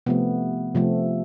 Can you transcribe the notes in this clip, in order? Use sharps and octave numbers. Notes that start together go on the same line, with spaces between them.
C3 F3 A3 B3
C3 F3 A3